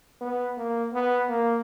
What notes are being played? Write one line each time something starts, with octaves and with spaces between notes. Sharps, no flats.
B3
A#3
B3
A#3